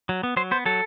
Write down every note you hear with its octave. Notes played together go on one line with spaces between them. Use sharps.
F#3
B3
F#3 C5
B3 C5
F#3 A4